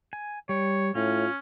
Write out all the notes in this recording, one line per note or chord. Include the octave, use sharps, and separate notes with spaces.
G#5
G3 C#5
A2 C#4 F4